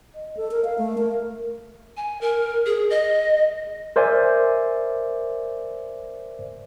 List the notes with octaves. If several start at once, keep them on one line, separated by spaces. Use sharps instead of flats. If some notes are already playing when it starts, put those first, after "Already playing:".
D#5
A4
A#4
F5
A3
A#4
G#5
A#4
G#4
D#5
A#4 C5 D5 E5 G#5